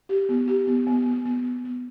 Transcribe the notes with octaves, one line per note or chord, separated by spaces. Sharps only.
G4
B3
G4
B3
B3
B3
B3
B3
B3